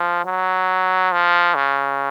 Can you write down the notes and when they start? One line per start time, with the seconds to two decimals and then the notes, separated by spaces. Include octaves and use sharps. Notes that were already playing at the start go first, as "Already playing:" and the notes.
Already playing: F3
0.25 F#3
1.12 F3
1.55 C#3